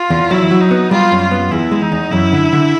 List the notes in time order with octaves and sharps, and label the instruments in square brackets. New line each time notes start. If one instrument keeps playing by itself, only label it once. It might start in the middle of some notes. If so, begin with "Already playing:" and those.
Already playing: [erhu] F4
[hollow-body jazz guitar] E2
[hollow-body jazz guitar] F#3 [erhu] E4
[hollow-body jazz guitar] F#3
[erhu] D#4
[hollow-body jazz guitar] B3
[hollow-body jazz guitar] G3 [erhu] F4
[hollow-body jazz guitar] F#2
[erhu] F4
[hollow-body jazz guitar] B3
[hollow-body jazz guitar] E2 [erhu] E4
[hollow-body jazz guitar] G#3
[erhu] D#4
[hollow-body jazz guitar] E2
[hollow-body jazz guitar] F#2 [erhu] E4
[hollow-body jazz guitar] D3
D3